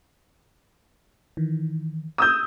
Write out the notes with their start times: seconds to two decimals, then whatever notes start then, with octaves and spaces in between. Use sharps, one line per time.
1.37 D#3 E3
2.18 D#6 E6 G6